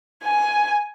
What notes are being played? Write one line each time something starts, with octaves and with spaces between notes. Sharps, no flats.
G#5